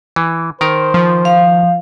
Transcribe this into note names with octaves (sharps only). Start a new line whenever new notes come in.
E3
D#3 A#4 C5
F3
F5